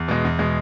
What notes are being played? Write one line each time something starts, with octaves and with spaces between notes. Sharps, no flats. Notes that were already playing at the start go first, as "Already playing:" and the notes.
Already playing: E2
B2 G#3
E2
B2 G#3